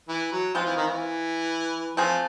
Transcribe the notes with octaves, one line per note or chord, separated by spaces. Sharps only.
E3
F#3
F3 G#3 C4 F4
E3
D#3
E3
F3 A3 C4 F4 G#4